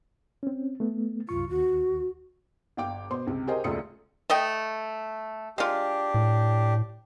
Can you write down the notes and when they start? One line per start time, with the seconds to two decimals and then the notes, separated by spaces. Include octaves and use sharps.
0.43 C4 C#4
0.80 A3 B3
1.29 C2 F#2 F4 C#6
1.50 D#2 F#4
2.77 G1 F5 G5 D6
3.10 B2 C5 C6
3.27 C#2 C3
3.47 G4 G#4 A#4 C5 D#5 G5
3.64 E1 C#2 A3 F4 D#6 C#7
4.30 A3 D#5 G5
5.58 G#3 D4 F4 G4
6.14 A2